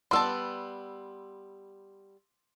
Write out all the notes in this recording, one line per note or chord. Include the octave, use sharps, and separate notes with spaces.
G3 B3 A5 C6 E6